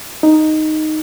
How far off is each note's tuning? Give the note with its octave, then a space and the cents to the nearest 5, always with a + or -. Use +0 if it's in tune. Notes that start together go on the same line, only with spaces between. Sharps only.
D#4 -5